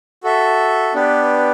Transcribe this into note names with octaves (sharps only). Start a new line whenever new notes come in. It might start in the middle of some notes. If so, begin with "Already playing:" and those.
F#4 A4 E5
B3 D4 G4 B4